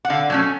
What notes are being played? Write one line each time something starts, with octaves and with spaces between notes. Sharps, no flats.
F#5
D3 F5
F#3 A3 C#4